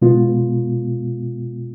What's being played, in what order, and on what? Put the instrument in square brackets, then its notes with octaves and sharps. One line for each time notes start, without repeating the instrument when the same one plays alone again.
[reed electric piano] B2 G#3 B3 F4